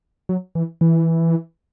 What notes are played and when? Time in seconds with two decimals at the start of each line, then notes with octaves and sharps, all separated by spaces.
0.29 F#3
0.55 E3
0.81 E3